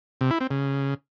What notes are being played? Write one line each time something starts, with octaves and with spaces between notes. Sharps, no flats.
C3
E4
C4
C#3